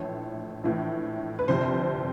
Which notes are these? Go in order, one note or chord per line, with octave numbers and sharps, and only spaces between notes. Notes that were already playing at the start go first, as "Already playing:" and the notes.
Already playing: A#1 A2 E3 A3 C#5
A#1 A2 E3 A3
B4
G1 F2 C3 C5